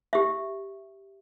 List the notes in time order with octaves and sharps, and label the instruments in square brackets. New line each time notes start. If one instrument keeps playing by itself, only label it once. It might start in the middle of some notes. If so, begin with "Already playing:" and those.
[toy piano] G4 E5